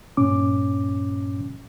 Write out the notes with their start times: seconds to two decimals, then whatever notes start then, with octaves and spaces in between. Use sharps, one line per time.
0.17 G2 A#2 C#4 D6